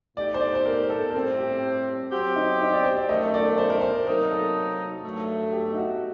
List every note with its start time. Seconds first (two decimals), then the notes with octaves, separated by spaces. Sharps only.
0.17 A2 A3 D#4 G4 D5
0.34 C5
0.41 D5
0.55 C5
0.66 A#4
0.90 A4
1.10 A#4
1.15 A2 G3 C4 A4
1.39 G4
2.12 F#3 C4 F#4 G4
2.36 D#4
2.61 D#4
2.73 D5
2.84 C5
2.97 D5
3.09 F#2 D#3 A3 D#5
3.34 D5
3.58 C5
3.70 A#4
3.81 C5
4.07 C3 F#3 A#3 D#4 A#4
4.31 A4
5.04 G2 F#3 A3
5.53 G4
5.73 D#4
5.77 F#4